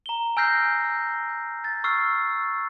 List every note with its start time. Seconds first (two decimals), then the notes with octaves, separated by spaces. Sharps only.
0.06 A#5 G7
0.37 G#5 E6 F6 G6 A#6 C7
1.64 A6
1.84 C#6 E6 F6 C7